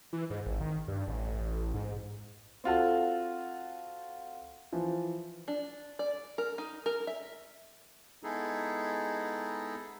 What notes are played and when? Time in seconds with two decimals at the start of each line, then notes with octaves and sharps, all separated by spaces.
0.13 E3
0.30 G#2
0.46 G#1
0.61 D#3
0.88 G2
1.07 A1
1.74 G#2
2.64 C4 F4 F#4 A4
4.72 E3 F3
5.48 D4
5.99 D5
6.38 A#4
6.58 D#4
6.86 A#4
7.07 E5
8.23 G#3 B3 D#4 E4 G#4 A4